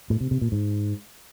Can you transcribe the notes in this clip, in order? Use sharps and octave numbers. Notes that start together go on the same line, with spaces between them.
A2
C3
C3
A#2
G#2